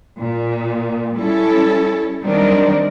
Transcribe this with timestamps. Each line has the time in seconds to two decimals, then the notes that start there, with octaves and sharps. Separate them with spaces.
0.17 A#2
1.18 G3 C#4 E4 A4
2.22 D#3 F#3 G3 C4 D4 A#4